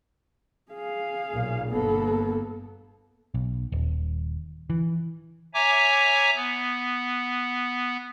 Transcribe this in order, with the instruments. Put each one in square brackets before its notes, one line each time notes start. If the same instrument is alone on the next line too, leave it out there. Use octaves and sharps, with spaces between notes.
[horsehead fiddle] G#4 F5
[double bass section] B1 A#2
[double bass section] G1 G2 B3 [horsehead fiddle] A#3 A4
[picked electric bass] B1
D#1
E3
[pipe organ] C#5 E5 G#5 A#5 D6
B3